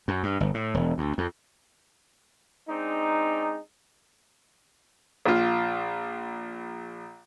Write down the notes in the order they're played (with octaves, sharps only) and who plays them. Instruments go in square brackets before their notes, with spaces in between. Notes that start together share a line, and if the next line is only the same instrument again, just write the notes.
[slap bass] F#2
G2
G1
A2
E1
D2
F2
[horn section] G#3 C4 D4 D#4
[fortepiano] A#1 F4